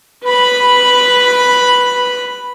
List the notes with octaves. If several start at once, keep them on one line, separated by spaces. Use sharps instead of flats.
B4 B5